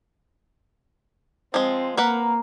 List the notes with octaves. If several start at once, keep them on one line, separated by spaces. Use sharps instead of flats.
F3 G#3 C4
A#3 A#4 B4 F#5 A#5